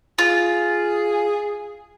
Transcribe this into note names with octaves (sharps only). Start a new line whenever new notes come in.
F4 G#4